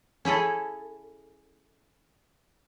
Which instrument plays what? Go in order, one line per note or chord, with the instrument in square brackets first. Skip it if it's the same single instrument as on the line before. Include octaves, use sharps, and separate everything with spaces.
[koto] C#4 E4 G#4 A4